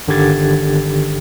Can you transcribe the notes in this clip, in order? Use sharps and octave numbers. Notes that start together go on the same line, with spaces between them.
G1 D3 D#3 G4 G#6 A6